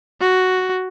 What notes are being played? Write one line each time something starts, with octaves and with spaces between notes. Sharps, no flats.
F#4